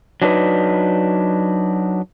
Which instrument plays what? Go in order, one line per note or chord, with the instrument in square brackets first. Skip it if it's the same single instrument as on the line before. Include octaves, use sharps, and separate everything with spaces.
[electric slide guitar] F#3 D4 D#4 B4